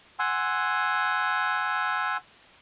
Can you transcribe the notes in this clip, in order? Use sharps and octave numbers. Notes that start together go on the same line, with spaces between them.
F#5 G#5 C6 E6